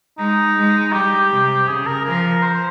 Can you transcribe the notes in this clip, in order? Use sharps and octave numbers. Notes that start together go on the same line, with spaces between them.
G#3 D#4
G#3
G3 G4
C3
C#3 G#4
A#4
F3 A#4
C5